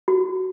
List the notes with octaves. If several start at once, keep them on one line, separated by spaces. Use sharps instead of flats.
F#4